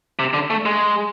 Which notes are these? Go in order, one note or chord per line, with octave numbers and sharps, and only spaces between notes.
C3
D3
A3
G#3